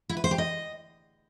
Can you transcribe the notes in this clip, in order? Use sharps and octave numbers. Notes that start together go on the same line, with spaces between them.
E4
B4
C5
G4
D#5